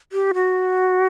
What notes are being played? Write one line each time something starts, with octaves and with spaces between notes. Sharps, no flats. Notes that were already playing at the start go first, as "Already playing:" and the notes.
G4
F#4